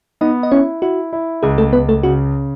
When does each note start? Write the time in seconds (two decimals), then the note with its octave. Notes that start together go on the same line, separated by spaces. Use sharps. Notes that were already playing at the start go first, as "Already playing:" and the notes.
0.21 B3 D#4 D#5
0.43 D#5
0.51 C#4 E4 C#5
0.82 E4 F#4
1.13 E4
1.43 C#2 G#4
1.58 A3 A4
1.73 C#2 B3 B4
1.88 A3 A4
2.03 C#3 F#4